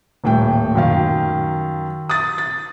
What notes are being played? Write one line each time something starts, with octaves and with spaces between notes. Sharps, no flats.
D#1 A2 G5
F#2 D#3 F5
D#6 A6
A6